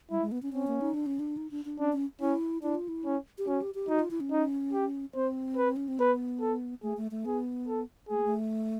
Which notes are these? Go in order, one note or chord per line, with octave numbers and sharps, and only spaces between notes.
G3 E4
G#3
B3
C#4
C4 C#4
A#3
D#4
D4
C#4
D4
D#4
D4
D4
C#4 D4
C#4
C#4 E4
D4 E4
F4
E4
C#4
G4
C#4 F#4
G4
G4
D#4 F#4
F4
E4
C#4
D#4
G4
C4 C5
B4
C#4
C4
B3 B4
A4
A3 G#4
A3
A3
B3 G#4
A4
A3 G#4
A#3
A3